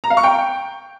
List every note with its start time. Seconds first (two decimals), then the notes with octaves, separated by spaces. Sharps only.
0.04 A#5
0.10 F5
0.17 C#6
0.24 G5